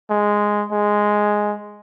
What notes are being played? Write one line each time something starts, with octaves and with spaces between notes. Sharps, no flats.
G#3
G#3